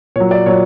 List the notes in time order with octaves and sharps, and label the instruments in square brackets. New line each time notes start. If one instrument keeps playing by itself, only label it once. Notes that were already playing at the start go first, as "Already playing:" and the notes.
[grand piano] A#2 C#5
F#3
D5
A#2 F#3 C#5